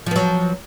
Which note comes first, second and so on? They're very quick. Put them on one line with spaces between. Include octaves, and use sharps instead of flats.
F3 B3 F#3